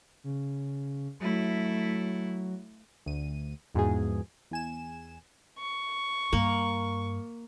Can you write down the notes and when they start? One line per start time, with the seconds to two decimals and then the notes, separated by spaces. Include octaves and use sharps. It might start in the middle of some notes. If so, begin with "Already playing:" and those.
0.24 C#3
1.20 F#3 A3 E4
3.06 D2 D#7
3.75 E2 G#2 B2 F3 G#4
4.51 E2 G#5 E7
5.59 C#6
6.33 G2 A#3